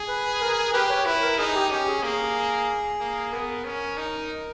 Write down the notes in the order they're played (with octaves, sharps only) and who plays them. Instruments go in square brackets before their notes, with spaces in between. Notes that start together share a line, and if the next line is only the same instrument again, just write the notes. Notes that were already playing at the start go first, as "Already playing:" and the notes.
Already playing: [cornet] G#4
[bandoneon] B4
A#4
[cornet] G4 [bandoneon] B4
[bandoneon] C#5
[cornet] E4 [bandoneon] B4
[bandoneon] A#4
[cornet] D#4 [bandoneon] G#4
[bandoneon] G4
[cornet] C#4 [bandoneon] G4
[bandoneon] G#4
[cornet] A#3 [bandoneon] G#4
[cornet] A#3
[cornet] B3 [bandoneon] A#4
[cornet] C#4
D#4